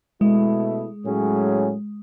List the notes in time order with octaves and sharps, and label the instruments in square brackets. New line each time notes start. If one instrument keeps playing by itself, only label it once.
[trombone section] B2 A3 E4 [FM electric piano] G#3
[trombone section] A2 F#3 C#4 G#4